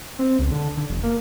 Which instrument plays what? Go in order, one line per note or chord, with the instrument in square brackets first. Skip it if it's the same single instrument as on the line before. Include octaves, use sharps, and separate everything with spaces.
[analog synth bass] C4
C#2
D3
D3
F1
A#3